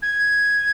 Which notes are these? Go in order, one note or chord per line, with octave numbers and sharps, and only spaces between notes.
G#6